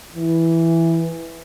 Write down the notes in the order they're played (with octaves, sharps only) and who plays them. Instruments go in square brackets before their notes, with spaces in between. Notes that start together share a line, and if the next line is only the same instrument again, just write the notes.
[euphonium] E3